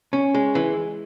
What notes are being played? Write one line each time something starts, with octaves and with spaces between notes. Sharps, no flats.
C#4
G#3
E3